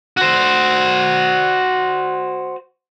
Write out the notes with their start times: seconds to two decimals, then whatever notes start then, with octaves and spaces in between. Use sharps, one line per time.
0.17 F#4 C5